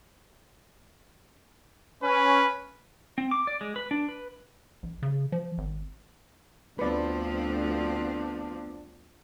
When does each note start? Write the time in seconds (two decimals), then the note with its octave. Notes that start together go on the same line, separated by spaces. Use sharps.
2.03 C#4 B4
3.18 C4
3.31 D6
3.47 D5
3.61 G#3
3.76 B4
3.91 D4
4.09 B4
4.83 A#1
5.02 C#3
5.32 F3
5.58 G#1
6.79 D2 F3 B3 C4 D4 B4 D5